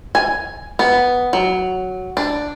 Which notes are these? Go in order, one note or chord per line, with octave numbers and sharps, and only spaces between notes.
G#5
B3
F#3
D4